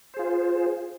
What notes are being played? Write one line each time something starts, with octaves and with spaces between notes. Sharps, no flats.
F4 G#4 C5